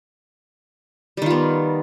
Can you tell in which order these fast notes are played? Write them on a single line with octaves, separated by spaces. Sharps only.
G3 D#3 F4 B3